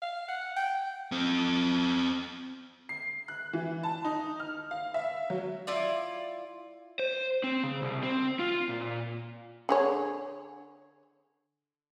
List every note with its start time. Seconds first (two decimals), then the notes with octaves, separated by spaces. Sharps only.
0.02 F5
0.28 F#5
0.57 G5
1.12 C4 A4
2.89 C7
3.28 F#6
3.53 E3
3.83 A5
4.05 D#4
4.40 F6
4.71 F5
4.94 E5
5.30 F#3
5.67 E4 F4 D5
6.99 C5
7.44 C4
7.64 C#3
7.82 C2
8.03 C4
8.39 F4
8.69 A#2
9.69 D3 G#4 C#5